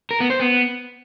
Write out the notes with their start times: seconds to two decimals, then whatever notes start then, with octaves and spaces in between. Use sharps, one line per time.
0.11 A#4
0.20 B3
0.30 C5
0.40 B3